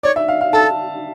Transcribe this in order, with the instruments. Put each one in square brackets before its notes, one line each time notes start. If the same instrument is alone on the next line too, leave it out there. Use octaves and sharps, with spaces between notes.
[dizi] C#5 [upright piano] D5
[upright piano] E5
F5
F5
[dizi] A4 [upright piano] A5